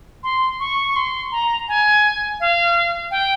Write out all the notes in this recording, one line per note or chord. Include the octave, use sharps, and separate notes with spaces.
C6
C#6
C#6
C6
A#5
G#5
F5
G5